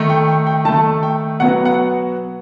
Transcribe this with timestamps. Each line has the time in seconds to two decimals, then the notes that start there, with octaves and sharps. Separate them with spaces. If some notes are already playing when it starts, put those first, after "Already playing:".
Already playing: D#3 A3
0.09 G5
0.28 G5
0.47 G5
0.65 D#3 A3 A5
1.03 G5
1.40 B2 F#3 B3 F#5
1.65 F#5